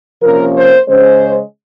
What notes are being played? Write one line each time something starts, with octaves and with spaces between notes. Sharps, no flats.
C3 F3 A#3 C#4 A#4
C5
C#3 G#3 C#4 C5